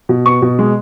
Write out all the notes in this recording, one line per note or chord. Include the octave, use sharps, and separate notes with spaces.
B2
B3 C#6
B2
G#3